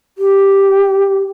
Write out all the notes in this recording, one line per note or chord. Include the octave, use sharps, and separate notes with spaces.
G4